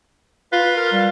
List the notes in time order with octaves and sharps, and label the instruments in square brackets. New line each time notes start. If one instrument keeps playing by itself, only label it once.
[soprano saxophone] F4 [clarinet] B4
[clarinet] A#4
G3